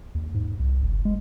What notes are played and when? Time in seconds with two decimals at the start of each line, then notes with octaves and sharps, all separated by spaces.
0.15 D#2
0.34 G#2
0.59 C2
0.83 F#1
1.05 G#3